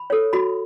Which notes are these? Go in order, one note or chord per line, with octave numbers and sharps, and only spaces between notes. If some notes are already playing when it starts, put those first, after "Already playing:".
Already playing: B5
A4 C#5
F#4 B5